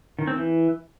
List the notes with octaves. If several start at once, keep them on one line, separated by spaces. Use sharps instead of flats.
D#3
C4
E3